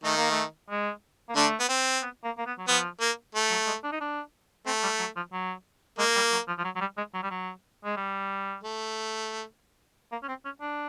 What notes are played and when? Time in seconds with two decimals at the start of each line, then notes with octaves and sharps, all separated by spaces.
0.04 D#3 A3 D#4
0.17 A#3
0.31 A3
0.70 G#3
1.29 A#3
1.36 D3 A3 D4
1.60 B3
1.69 C4
2.02 B3
2.24 A#3
2.38 A#3
2.46 B3
2.59 F#3
2.68 F3 B3
3.01 A#3
3.35 A3
3.51 F#3
3.67 G#3
3.84 D4
3.92 D#4
4.01 D4
4.66 A3 C4
4.83 G3
4.99 F#3
5.16 F3
5.33 F#3
5.98 G#3 A#3
6.16 G3
6.32 F#3
6.48 F3
6.58 F3
6.64 F#3
6.76 F#3
6.81 G3
6.97 G#3
7.14 F#3
7.23 G3
7.31 F#3
7.85 G#3
7.96 G3
8.63 A3
10.12 A#3
10.23 C#4
10.29 C4
10.45 C#4
10.61 D4